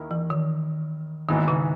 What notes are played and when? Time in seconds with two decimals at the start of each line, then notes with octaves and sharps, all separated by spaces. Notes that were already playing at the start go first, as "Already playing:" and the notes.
Already playing: D#2 D#3 A#3 E4 A#4
0.11 E3
0.30 D#3
1.29 G#1 G#2 D#3 E3 B3 D#4
1.48 C#3